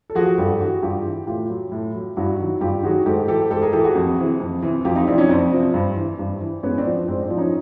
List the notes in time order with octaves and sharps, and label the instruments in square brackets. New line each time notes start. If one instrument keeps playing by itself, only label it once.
[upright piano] A4
F3 F#4 G#4
G2 G4 A4
E3 F#4 G#4
G2 F4 G4
E3
A2 F4 G4
F#3
A2
F#3
G2 E4 F#4
D#3 F#3
G2 F4 G4
D#3 F#3 F#4 G#4
G#2 G4 A4
E3 G4 A4
G#2 G4 A4
G#4 A#4
E3 G4 A4
F#4 G#4
F2
C3 E3
F2
C3 E3
F2 F4 G4
D#4 F4
C3 F3 D4 E4
C#4 D#4
F2 C4 D4
C3 F3
G2
E3
G2
E3
G#2 B3 C#4
C4 D4
F3
G#2 C4 D4
C4 D4
F3
C#4 D#4